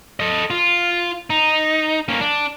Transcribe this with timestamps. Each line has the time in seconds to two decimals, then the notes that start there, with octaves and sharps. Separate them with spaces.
0.20 A4 D#5
0.51 F4
1.30 D#4
2.09 A#3 C#4
2.21 D4